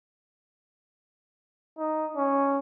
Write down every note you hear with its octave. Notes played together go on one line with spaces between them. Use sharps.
D#4
C#4